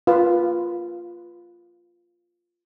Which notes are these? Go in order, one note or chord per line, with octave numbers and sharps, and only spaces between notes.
F4 B4